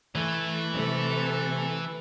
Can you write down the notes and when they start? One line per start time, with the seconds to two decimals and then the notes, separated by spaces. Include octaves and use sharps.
0.15 E3 A3
0.73 C3 A3 A4